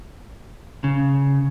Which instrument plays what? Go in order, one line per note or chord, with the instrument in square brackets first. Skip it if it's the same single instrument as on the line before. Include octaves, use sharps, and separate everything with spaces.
[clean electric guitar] C#3